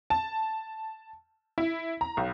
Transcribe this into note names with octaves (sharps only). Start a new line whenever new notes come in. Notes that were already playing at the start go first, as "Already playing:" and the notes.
A5
E4
A#5
B1